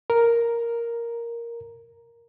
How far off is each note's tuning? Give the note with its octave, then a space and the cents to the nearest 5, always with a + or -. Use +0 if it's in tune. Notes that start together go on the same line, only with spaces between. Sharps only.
A#4 +0 A#5 +0